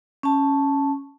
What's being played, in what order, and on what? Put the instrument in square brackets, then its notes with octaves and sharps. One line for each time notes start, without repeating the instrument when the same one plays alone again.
[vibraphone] C#4 A5